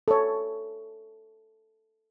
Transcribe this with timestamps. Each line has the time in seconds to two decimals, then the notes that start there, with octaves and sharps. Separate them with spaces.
0.08 A4 C#5